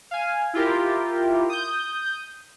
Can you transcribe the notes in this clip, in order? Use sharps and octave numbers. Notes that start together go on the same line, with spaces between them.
F5 G#5
E4 F4 G4 A#4
D#6 G6